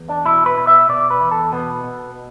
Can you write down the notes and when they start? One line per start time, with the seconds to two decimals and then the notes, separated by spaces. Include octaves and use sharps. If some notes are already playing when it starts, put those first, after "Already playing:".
Already playing: E2
0.09 D4
0.25 B2 E4
0.46 B4
0.57 B2
0.67 E5
0.89 B2 D5
1.10 B4
1.21 E2
1.31 A4
1.52 B2 B3
1.84 B2